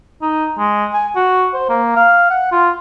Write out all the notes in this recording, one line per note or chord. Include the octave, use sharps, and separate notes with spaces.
D#4
G#3
G#5
F#4
C5
A#3
F5
F#5
F4